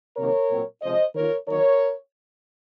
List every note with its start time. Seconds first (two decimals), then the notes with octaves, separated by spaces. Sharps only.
0.17 C3 D#3 F#3 A#3 A#4 C#5
0.49 A#2 F#3 C4
0.82 C3 F3 G#3 C5 D#5
1.15 D#3 A#3 F4 A#4 C#5
1.48 D#3 F#3 A#3 D#4 A#4 C#5